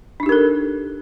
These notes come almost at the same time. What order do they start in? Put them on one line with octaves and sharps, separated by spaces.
D4 D#4 G4 A#4 A4